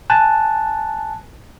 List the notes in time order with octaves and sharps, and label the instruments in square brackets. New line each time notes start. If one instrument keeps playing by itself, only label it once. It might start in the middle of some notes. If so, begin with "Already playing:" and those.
[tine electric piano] G#5 A5 F#6